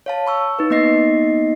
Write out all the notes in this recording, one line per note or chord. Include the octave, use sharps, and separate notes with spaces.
C#5 F5 A5
B5 C#6 E6
D#4 B4
A#3 B3 D#4 D#5 A#6 C7